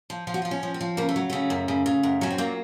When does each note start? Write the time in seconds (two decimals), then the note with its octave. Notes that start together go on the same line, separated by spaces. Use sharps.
0.10 F3
0.27 F3 F4
0.34 F#4
0.42 F3 F4
0.51 C#4
0.63 F3
0.74 C4
0.81 F3
0.97 C#3 A#3
1.09 A3
1.16 F#3
1.30 C#3 A3
1.50 F#2
1.68 C#3
1.86 C#3
2.03 F#2
2.21 F#3 C#4
2.30 C4
2.38 A#2 A#3